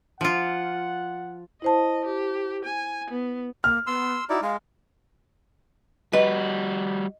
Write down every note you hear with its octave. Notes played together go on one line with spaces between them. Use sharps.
F3 F4 F#5
E4 C5 D#5 A5
G4
G#5
B3
A#3 F6
B3 C6 E6
D#4 E4 F#4 D5
G#3 F5
G3 F#4 B4 D#5